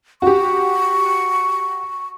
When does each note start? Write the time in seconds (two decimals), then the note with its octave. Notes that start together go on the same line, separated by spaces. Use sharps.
0.22 F#4 G4 C#6